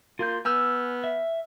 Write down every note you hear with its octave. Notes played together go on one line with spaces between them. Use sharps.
A#3 F4 C6 G6
B3 G#5 E6 F6 G6
E5